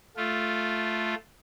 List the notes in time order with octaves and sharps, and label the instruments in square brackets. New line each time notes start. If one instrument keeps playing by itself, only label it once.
[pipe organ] A3 F4